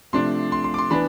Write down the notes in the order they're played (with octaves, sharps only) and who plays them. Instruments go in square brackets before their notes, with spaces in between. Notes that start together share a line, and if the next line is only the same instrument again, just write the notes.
[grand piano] C3 F3 A3 D4 C6
C6
C6
D6
C6
E3 B3 D4 B5